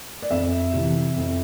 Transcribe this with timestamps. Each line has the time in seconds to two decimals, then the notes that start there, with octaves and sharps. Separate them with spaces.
0.22 D5
0.31 F2 E5
0.73 C3 E3
1.16 F2